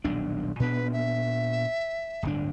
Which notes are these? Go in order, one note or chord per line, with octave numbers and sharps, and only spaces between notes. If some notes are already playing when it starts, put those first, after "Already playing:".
D#1 B1 D4
A#2 B3 D4 B4
E5
D1 G1 D4